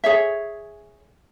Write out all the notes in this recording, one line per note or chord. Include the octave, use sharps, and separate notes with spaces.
G#4 C#5 E5